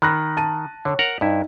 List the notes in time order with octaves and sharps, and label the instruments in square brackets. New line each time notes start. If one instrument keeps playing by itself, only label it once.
[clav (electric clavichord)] D#3 [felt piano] B5 F#6 A#6
[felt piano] A5 D#7
[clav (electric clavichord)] D3 [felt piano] C#5
[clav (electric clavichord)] A#4 F#5 A#5
[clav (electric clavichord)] G2 E4 [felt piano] D#4